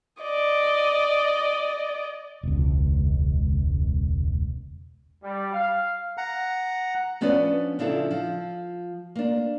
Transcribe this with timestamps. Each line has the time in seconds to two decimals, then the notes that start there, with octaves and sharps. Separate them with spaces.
0.22 D5 D#5
2.43 E1 C#2
5.24 G3
5.54 F5
6.18 F#5 A#5
7.21 F3 B3 C#4 D4 B4 D5
7.79 C#3 F3 D4 E4 A4
8.11 F3
9.16 A#3 D4